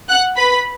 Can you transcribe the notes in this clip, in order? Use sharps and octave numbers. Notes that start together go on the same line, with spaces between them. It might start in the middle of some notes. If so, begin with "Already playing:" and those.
F#5 F#6
B4 B5